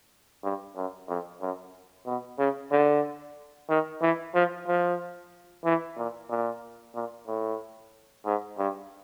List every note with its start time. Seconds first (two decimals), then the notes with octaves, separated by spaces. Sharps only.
0.43 G2
0.76 F#2
1.08 F2
1.41 F#2
2.06 B2
2.38 C#3
2.71 D3
3.69 D#3
4.01 E3
4.34 F3
4.67 F3
5.65 E3
5.97 A#2
6.30 A#2
6.95 A#2
7.27 A2
8.25 G#2
8.58 G2